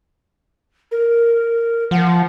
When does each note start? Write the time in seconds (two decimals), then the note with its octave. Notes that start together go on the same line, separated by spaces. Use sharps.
0.91 A#4
1.91 F3 F#5